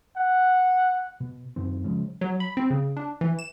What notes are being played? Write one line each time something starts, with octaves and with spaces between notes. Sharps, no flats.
F#5
B2
F#2 D#3 C4
C#3 F3 G#3 C#4
F#3
B5
C4
C#3
D4
E3
E7